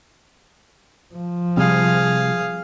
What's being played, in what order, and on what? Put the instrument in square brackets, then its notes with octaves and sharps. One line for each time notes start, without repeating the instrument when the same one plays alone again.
[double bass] F3
[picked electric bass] C3 G3 C4 [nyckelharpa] G#4 F5